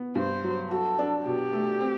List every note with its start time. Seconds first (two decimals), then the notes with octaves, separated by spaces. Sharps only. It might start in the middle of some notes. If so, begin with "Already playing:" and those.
Already playing: B3
0.15 G2 C5
0.44 F#3
0.71 F#4 A4
0.99 D4
1.26 B2 G4
1.53 A3
1.81 C4